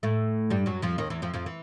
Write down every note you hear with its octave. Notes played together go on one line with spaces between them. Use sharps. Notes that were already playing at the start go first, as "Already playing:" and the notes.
A2 A3
G2 G3
F#2 F#3
F2 F3
D#2 D#3
E2 E3
F2 F3
F2 F3
E3